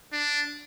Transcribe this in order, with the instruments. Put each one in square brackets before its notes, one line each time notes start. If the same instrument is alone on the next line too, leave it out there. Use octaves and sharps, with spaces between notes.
[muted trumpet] D4